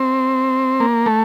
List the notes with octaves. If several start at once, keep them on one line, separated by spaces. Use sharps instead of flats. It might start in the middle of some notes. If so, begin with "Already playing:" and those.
Already playing: C4
A#3
A3